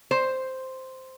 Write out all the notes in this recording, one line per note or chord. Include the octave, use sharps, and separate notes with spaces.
C5